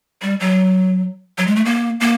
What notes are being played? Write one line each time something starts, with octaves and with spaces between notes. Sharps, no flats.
G3
F#3
F#3
G#3
A3
A#3
A#3